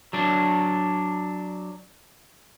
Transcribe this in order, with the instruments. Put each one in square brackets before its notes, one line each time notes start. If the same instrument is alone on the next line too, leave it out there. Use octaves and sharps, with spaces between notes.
[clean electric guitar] F#3 D4